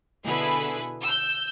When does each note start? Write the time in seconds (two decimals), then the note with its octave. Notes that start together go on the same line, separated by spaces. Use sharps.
0.24 B2 D3 E4 G#4 A4 B4
1.03 E6 G6